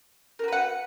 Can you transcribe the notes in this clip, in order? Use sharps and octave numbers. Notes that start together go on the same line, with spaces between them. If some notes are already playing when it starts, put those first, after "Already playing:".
F#4 A#4 B4 F#5